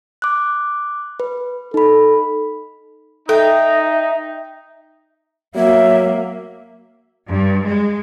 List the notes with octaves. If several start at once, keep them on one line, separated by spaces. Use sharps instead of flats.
D6 F#6
B4
D#4 A4 B5
D#4 A4 E5 G5 A#5
F#3 A#3 E5
G2
G#3